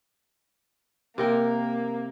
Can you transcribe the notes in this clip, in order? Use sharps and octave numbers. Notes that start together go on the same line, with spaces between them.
C3 A#3 A#4 G5